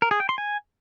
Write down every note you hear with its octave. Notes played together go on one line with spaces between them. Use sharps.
A#4
G#4
G5
C6
G#5